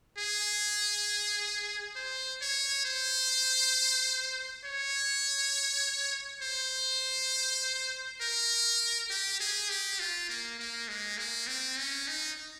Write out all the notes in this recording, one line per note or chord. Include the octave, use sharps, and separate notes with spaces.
G#4
C5
C#5
C5
C#5
C5
A#4
G4
G#4
G4
F4
A#3
A#3
G#3
A#3
C4
C#4
D#4